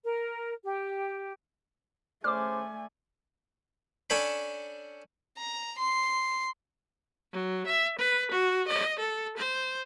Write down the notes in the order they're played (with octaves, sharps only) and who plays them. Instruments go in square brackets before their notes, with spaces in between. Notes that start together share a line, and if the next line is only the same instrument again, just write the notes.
[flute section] A#4
G4
[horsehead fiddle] A3 G#5 [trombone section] C#4 G#4 C5 [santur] D5 [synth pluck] D6 F6
[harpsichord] C#4 D4 A4 C#5 G5 B5
[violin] A#5
C6
[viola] F#3
E5
B4
F#4
D#5
A4
C5